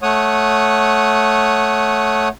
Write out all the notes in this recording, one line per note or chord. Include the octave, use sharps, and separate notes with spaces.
A3 C#5 F#5 D#6